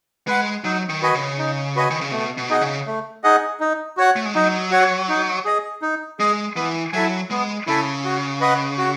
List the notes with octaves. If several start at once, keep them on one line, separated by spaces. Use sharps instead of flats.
G#3 B4 F#5
F#3 D#4
D#3
F#4 B4 D#5 G#5
C#3
D#4
F#4 B4 D#5 G#5
D#3
C#3
B2 A3
B2
D#4 G#4 D#5 F#5
C#3
A3
D#4 G#4 D#5 F#5
D#4
F#4 C#5 F#5
A3
G#3
F#3 D#4
F#4 C#5 F#5
D#4
G#4 D#5
D#4
G#3 G#4 D#5
E3 B3
F#3 E4 A4 E5 G#5
G#3 B3
C#3 E4 A4 E5 G#5
F#4
B4 D#5 F#5
F#4